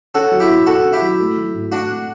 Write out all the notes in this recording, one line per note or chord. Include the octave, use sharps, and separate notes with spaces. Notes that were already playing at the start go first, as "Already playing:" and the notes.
C#4 F#4 A4
F#3
E4 G4
B2
B2 F#4 A4
C#4
E4 G4
F#3
A3
F#3
A2
A2 D4 F#4
A3